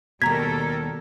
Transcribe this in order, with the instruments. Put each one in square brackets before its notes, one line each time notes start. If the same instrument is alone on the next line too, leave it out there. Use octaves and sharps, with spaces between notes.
[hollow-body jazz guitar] D#2 B2 [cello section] G3 A4 A#4 [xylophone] A#5 B6 [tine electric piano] G#6